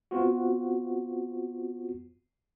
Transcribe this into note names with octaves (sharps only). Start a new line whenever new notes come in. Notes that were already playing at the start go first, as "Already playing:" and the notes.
B3 C4 F4 F#4